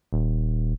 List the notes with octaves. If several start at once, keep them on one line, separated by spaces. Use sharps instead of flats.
D#1